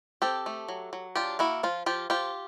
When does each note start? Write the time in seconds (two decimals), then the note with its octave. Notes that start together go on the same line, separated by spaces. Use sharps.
0.22 C4 G4 A4
0.46 A3
0.68 F#3
0.93 F#3
1.16 D4 F4 G4
1.39 A#3 E4 F#4
1.63 F3 F4
1.86 F3 F4 G4
2.10 F3 F4 G4